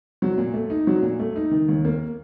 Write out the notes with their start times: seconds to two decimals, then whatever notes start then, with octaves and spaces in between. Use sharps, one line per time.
0.22 F#3
0.38 A#2
0.54 A3
0.70 D#4
0.87 F#3
1.02 A#2
1.19 A3
1.36 D#4
1.51 D#3
1.68 D#2
1.85 A#3